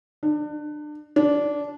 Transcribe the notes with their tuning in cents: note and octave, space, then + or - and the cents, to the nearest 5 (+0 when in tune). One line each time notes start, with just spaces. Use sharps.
D4 +30
D4 -15